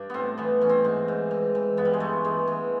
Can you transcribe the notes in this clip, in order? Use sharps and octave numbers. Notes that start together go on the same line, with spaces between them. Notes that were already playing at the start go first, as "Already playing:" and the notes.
Already playing: G2 D4
A2 B3 C4
E3 B3
E3 C#4
C4
G#2
G#2
E3
E3
G2 B3
G3
G#3
G2 A3
E3 G#3
E3